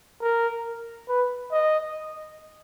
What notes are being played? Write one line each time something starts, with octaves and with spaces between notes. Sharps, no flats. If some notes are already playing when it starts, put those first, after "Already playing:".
A#4
B4
D#5